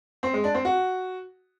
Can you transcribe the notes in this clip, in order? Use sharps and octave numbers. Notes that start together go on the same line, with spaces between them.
C4
G#3
D4
C4
F#4